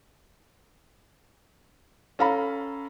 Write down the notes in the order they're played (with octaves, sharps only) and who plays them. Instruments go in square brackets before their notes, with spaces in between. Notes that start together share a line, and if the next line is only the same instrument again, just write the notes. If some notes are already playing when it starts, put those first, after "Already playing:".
[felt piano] C#4 A4 F5 A#5 B5